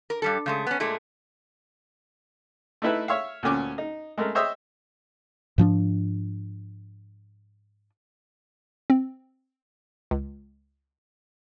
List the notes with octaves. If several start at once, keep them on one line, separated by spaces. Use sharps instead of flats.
A#4
G2 G3 A4
C#3 G#3 A3
B3 C#4
A#2 G#3 A3
A3 D#4 E4 B4
C#5 E5 F5
D2 A#2 C#4 D6
D#4
G#3 A3 A#4
C5 C#5 D#5 E5 D#6 E6
G#2 F3 C#4 D4
C4
C#2